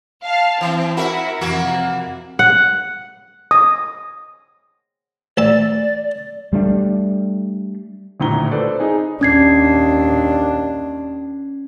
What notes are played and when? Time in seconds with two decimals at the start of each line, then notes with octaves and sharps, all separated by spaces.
0.24 F5 A5
0.61 E3 C4
0.97 E4 F#4 A#4 E5
1.41 F2 C3 E3 A#3 F#4
2.39 F#5
3.51 D#6
5.37 A1 D5 E5 A5
6.53 G3 A3 D4
8.20 D#1 D2 A2 A#5 G7
8.51 A4 B4 C5 D5
8.80 D#4 G#4
9.21 D#2 C#4 D4 G#6 C7